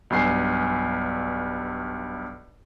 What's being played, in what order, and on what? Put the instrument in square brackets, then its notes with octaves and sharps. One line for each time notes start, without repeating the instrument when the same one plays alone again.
[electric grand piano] B1 G2 G#5 C7